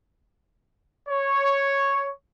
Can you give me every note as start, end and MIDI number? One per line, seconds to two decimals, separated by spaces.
1.09 2.10 73